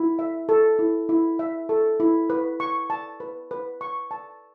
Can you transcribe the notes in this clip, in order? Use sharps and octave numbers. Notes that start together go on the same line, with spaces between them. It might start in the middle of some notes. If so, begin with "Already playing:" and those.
Already playing: E4
E5
A4
E4
E4
E5
A4
E4
B4
C#6
A5
B4
B4
C#6
A5